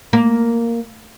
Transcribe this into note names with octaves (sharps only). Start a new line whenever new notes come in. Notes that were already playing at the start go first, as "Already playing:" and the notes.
A#3